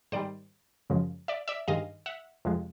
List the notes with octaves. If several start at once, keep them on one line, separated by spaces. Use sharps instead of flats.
G#2 D#3 G3 C5 D5
F#2 C#3 F3 G#3
D5 E5
D5 E5
G2 D#3 G#3 D#5 F5
E5 F#5
F2 C3 F3 G#3